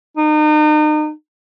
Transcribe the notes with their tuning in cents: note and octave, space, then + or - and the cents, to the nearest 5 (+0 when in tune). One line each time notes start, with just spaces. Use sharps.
D#4 -35